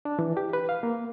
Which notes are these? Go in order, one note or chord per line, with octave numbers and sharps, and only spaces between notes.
D4
E3
G4
B4
F5
A#3